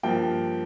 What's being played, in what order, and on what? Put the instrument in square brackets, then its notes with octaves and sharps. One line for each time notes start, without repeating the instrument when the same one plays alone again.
[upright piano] G2 F3 A#3 G5